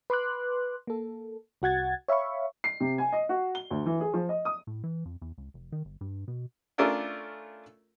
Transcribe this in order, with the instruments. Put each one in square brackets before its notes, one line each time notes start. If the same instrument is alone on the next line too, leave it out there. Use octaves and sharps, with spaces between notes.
[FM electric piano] B4 C6 D6 F#6
A#3 A4
C2 F#4 F#5 G#6 A6
C#5 E5 F5 B5 C#6
[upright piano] C7
C3
G#5
D#5
F#4
G7
D2
E3
G#4
F3
D#5
D#6
[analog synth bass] A2
E3
F2
E2
C#2
F1
D#3
G1
G2
B2
[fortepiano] A3 C#4 D4 F4 A#4 E5